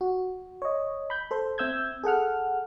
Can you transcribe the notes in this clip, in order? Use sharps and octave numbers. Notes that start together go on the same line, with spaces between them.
F#4
C#5 D#5
B5 G6
A4 C5
C4 E5 E6 G6 G#6
G#4 A4 F#5 F6